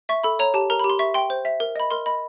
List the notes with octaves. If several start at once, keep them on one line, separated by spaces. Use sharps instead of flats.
E5 C#6
A4 B5
C#5 A#5
G4 A5
A#4 A#5
G4 B5
C6
E5 C#6
G5 C6
C5
E5
A#4
D#5 B5
A#4 C6
D#5 B5